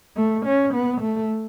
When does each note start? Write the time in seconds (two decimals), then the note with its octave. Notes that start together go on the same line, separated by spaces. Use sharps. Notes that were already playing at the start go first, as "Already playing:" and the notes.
0.17 A3
0.45 C#4
0.74 B3
1.01 A3